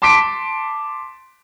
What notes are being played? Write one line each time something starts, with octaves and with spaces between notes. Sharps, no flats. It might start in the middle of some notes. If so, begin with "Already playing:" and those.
A5 C6 D6 B6 D7